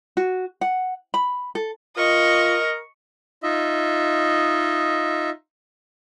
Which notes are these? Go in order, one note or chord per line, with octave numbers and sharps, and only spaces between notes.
F#4
F#5
B5
A4
F4 A#4 D#5 C#6
D#4 F4 D#5 E5